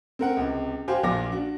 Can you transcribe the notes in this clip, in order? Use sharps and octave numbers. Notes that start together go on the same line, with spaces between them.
C4 A#4 F#5
C#2 C3
F#4 G4 C5 F5 G#5
A#1 A#2 F4 D6 A#6
D4 F#4